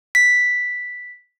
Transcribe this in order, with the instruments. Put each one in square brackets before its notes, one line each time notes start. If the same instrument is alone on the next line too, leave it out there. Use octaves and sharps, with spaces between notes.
[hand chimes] B6